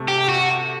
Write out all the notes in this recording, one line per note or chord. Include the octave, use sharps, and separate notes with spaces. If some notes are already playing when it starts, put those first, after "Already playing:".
Already playing: C3 A3
G4
F#4